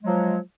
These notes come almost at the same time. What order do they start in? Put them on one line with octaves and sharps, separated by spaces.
G#3 F#3 F3